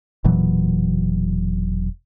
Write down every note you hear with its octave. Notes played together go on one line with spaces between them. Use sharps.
E1 A#2 E3 F#3